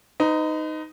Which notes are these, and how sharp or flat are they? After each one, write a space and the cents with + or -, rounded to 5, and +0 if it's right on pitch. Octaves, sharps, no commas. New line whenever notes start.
D#4 +0 B4 +45